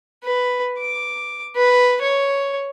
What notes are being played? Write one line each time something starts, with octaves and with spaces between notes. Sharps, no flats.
B4
D6
B4
C#5